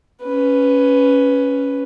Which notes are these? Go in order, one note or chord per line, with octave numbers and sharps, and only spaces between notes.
C#4 B4